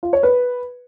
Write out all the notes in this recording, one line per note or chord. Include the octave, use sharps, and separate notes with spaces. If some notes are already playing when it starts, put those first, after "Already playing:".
F4
C#5
B4